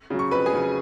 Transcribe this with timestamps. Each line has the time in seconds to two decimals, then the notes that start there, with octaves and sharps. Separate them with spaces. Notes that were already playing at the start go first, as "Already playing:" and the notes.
0.10 C#3 F#3
0.19 C#6
0.31 F2 B4 B5
0.46 G#4 G#5
0.53 C#3 F#3